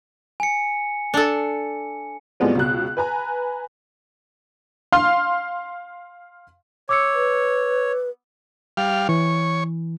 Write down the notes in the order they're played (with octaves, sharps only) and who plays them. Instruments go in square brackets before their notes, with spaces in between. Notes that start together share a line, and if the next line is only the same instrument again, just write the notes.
[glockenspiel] G#5 C#7
[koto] D4 A4
[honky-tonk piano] A2 F3 G3 G#3 B3 C4
C#2 B2 F#6
B4 G#5 A#5
F5 C6 F6
[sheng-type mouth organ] C#5 [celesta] D6 E6 C#7
[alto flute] B4
[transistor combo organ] G3 F5
[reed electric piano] E3 [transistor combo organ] C#5